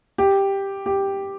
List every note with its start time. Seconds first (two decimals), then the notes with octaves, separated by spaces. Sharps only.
0.18 G4
0.86 G4